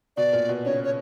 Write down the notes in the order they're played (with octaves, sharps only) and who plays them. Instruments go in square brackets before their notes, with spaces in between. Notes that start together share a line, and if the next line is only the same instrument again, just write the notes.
[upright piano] B2 [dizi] D5
[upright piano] A#2
B2
[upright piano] C#3 [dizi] C#5
[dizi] C#5